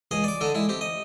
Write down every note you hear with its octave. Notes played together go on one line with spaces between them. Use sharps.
C#2 G#4 D#5
D5 D6
D3 D4 D#4 A4
G#3 E4
C4 G4
D#5